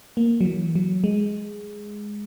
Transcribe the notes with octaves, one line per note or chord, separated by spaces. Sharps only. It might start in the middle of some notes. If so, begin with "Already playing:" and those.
A#3
F#3
E3
F#3
G#3